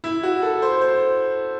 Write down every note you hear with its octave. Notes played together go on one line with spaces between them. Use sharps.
E4
F#4
A4
C5
C5